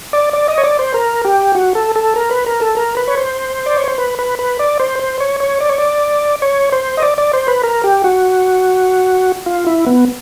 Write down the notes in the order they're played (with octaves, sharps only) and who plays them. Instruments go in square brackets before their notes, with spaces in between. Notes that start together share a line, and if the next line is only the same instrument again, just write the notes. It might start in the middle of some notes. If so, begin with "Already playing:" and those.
[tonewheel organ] D5
D5
D#5
C#5
D5
C5
A#4
G4
F#4
A4
A4
A#4
B4
A#4
A4
A#4
B4
C#5
C5
D5
C#5
C5
B4
B4
B4
D5
C5
C5
C#5
C#5
D5
C#5
D5
C#5
C5
D#5
D5
D5
C5
B4
A#4
G4
F#4
F4
E4
B3